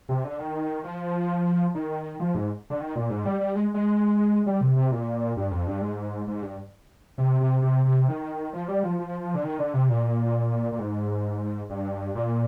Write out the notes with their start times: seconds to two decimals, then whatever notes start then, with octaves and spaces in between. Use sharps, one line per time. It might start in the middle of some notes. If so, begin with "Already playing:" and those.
0.09 C3
0.24 D3
0.39 D#3
0.84 F3
1.75 D#3
2.20 F3
2.35 G#2
2.70 D3
2.80 D#3
2.95 A#2
3.10 G#2
3.25 G3
3.40 G3
3.55 G#3
3.74 G#3
4.46 G3
4.61 C3
4.76 C3
4.91 A#2
5.37 G2
5.51 F2
5.67 G2
5.81 G#2
6.27 G#2
6.42 G2
7.18 C3
7.40 C3
7.62 C3
7.85 C3
8.08 D#3
8.53 F3
8.68 G3
8.83 F3
8.98 F3
9.34 D3
9.44 D#3
9.59 D3
9.74 C3
9.89 A#2
10.72 A#2
10.79 G#2
11.70 G2
12.15 A#2